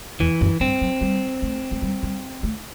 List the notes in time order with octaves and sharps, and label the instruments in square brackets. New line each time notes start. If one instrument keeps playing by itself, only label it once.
[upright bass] E2 [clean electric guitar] E3
[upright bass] F#2
[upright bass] G2 [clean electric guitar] C4
[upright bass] F#3
G3
A3
A3
G3
G3
A3